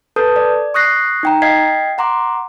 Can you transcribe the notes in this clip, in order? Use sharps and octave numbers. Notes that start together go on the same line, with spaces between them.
A4 B4 A5 D#6 G6
D5
C#6 D#6 F#6 A#6 C7
D#4 G5 A#5
D#5 F5 G5 G#6 B6 C7
F#5 A#5 C6 D6